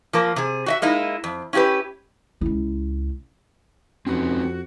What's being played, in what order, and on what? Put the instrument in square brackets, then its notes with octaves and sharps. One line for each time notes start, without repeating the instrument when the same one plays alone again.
[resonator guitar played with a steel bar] F3 A#3 A#4
C3 G#4
F#4 D#5 E5
G#3 A#3 D#4 E4
F2
C#4 E4 F#4 G4 B4
[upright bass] C#2 E4
[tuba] F2 [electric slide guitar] C4 D#4 B4 [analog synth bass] C#4 [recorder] F#4